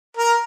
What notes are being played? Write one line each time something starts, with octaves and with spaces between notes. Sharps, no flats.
A#4